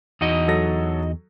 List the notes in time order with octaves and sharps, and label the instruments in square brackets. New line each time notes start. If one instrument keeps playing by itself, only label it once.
[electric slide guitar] E2 [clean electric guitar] D#4 F#4 D#5
[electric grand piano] F#3 A4 A#6